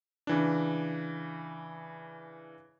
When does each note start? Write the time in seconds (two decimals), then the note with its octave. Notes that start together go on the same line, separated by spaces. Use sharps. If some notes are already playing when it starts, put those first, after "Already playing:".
0.27 C#3 E3 D4